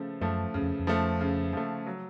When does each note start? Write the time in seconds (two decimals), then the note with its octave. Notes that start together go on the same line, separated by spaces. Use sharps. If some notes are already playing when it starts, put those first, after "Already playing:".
Already playing: C#3 F3 A3
0.21 F#2 F3 A3
0.54 F#2 C#3
0.62 F2
0.79 F2
0.87 F3 A3
1.21 C#3
1.53 F3 A3
1.87 F#3